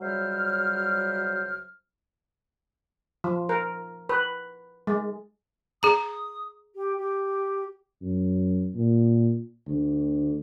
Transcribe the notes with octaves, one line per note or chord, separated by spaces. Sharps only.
C#2 F#3 G3 C5 E5 F6
F3
A#4
B4
G#3
G#4 A#5 D#6
G4
G4
F#2
A#2
D2